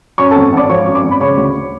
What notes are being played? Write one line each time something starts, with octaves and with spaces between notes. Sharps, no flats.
F#2 C#5 C#6
G#1 A4 A5
G#1 D5 D6
F3 C#5 C#6
F#2
D5 D6
G#1
B5
C#3 C#5 C#6
D2